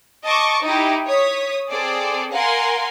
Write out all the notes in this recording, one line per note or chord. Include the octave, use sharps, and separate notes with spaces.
D#5 A5 C#6 D6
D#4 E4 G4
C#5 D#6 B6
C4 G#4 A4 D5
A#4 F5 F#5 G#5 C6